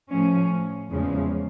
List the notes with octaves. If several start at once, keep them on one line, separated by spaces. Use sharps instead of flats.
A2 F3 A3 C#4
E2 C#3 F3 G#3